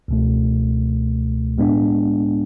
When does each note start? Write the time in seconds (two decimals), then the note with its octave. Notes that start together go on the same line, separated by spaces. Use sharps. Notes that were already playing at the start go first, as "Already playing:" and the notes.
0.08 C#2 B2 A3
1.58 A2 G#3 B3 D4